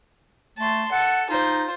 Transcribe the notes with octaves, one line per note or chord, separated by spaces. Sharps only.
A3 A5 C6
A4 F#5
D#4 F4 C5